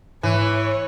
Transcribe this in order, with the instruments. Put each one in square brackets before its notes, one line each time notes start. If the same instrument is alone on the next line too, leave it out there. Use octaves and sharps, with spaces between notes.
[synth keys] G#2 [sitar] E3 [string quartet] C#5